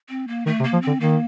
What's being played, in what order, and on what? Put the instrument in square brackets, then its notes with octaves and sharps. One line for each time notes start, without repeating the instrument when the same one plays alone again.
[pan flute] C4
A#3
[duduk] D#3 [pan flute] A3
[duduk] C3
[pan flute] A#3
[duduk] F3
[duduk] D3 [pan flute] C4
[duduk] D#3 [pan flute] A#3